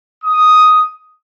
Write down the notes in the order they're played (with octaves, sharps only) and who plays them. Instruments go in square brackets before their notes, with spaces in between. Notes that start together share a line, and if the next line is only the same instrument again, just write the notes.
[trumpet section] D#6